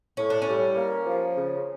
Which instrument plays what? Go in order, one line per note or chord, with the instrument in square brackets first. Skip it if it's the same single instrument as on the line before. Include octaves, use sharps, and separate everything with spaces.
[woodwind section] A2 [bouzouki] C#4
[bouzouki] D4
C#4
[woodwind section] G3
A#3
F3
C#3